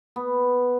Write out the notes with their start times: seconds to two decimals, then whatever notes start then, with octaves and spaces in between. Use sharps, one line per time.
0.16 B3